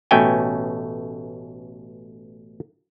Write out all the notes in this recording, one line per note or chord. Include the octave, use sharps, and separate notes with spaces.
A1 B2 A3 C#4 G5 G#5